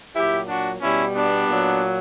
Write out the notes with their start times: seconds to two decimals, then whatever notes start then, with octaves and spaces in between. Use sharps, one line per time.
0.15 A#2 F#3 E4 G4
0.48 D4 F#4
0.81 B2 G3 C#4 E4
1.15 B3 D4
1.48 A#2 F#3